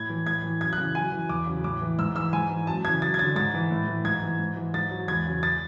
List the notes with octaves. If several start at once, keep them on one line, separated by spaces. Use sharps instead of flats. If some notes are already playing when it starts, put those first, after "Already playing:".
Already playing: A2 G#6
E3
A2 G#6
E3
F#2 G#6
F#6
C#3 E3
F#2 G#5
E3
E2 D6
C#3 F#3
A2 D6
E3
G#2 E6
E3 E6
G#2 G#5
E3
F#2 A5
C#3 E3 G#6
F#2 A6
G#6
D3 F#3 A6
G#2 A6
E3
A2
E3
G#2 G#6
E3
G#2
E3
G#2 A6
F#3
E2 G#6
C#3 F#3
A6